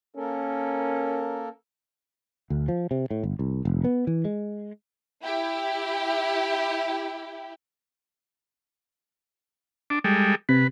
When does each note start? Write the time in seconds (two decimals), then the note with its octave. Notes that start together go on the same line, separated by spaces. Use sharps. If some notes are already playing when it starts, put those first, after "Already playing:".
0.16 A#3 C#4 A4 A#4
2.50 D2
2.68 F3
2.91 C3
3.11 A2
3.23 G1
3.39 C2
3.65 F1
3.84 B3
4.07 E3
4.25 G#3
5.22 E4 G4
9.90 D4
10.04 G3 G#3 A4
10.49 C3 B4